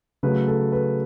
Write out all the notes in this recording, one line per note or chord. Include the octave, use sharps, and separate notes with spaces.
C#3 F#3 A3 B4
A4
B4